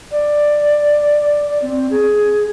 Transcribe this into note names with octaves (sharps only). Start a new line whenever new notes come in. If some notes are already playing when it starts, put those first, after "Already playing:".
D5
C4
G#4